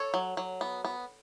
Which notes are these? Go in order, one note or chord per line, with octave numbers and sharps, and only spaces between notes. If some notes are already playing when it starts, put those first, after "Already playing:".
Already playing: A4 C#5
F#3
F#3
B3
B3